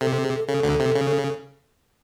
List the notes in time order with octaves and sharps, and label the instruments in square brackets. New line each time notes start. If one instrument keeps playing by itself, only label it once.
[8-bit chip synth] C3 [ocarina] A4
[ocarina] A4
G#4
A4
[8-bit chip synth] C#3 [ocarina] A4
[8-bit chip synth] D2 D3
C3
C#3